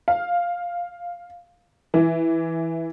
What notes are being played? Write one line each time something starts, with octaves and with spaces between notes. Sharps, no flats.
F5
E3